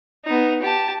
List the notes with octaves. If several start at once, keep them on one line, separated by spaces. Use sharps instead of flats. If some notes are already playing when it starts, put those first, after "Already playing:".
B3 D#4
G4 A5